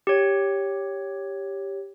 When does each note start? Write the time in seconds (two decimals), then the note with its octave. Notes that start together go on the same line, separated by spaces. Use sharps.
0.07 G4 C#5